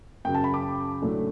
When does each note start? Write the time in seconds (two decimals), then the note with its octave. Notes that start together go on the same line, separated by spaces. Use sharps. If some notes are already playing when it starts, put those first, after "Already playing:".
0.25 F#2 C#3 F#3 G5
0.35 A5
0.44 B5
0.54 D6
1.02 A2 F#3 A3 D4